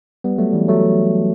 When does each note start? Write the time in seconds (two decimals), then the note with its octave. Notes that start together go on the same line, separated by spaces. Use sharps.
0.24 G3 B3
0.38 F#3 A3
0.53 E3 G3
0.68 F#3 A3